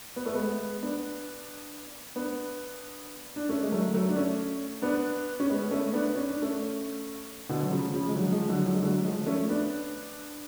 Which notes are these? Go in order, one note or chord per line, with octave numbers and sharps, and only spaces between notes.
B3
A3
G#3 B3
B3 D4
B3 D4
D4
A3 C#4
G#3
F#3 A3
F#3 A3
D4
A3 C#4
B3 D4
C#4
G#3 B3
A3 C#4
B3 D4
C#4
D4
A3 C#4
B2 D3
F#3
C#3 F3
C#3 F3
G#3
D3 F#3
F3 G#3
D3 F#3
D3 F#3
G#3
D3 F#3
F3 G#3
A3 C#4
B3 D4